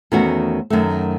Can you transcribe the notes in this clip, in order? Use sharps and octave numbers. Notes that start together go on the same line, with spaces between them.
E2 D#3 A3 C#4 F#4
F#2 D#3 A3